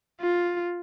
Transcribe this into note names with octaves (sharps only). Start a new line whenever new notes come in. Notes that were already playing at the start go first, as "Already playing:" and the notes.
F4